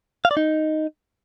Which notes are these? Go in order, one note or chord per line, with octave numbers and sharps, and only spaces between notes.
F5
D5
D#4